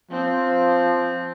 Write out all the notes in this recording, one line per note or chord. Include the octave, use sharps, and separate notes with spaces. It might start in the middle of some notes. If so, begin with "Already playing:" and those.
F3 C4